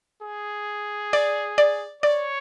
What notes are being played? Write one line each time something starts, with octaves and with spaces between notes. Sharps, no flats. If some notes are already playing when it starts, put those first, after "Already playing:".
G#4
D5
D5
C#5 D5